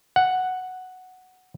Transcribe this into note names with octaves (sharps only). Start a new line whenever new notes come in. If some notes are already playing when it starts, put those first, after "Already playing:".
F#5